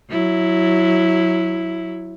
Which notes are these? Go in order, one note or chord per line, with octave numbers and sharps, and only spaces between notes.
F#3 E4